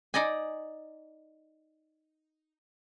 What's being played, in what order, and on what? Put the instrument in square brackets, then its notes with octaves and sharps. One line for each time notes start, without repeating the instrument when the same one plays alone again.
[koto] D#4 D5 D#5 G#5